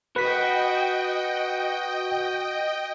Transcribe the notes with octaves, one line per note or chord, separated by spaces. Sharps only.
F#4 B4 D#5 G5 B6